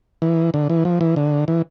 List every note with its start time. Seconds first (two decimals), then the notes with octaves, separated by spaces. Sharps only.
0.22 E3
0.54 D3
0.70 E3
0.85 F3
1.01 E3
1.16 D3
1.48 E3